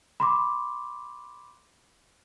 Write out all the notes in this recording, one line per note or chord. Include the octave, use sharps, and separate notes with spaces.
B5 C6 D6